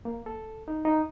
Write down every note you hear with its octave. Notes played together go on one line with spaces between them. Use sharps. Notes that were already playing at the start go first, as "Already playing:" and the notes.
A#3
A4
D#4
D#4